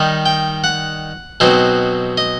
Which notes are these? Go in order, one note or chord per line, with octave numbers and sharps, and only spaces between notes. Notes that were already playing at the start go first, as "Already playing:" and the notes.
Already playing: D#3 G3 D#4
G5
F#5
B2 F#3 C4 D#4
D#5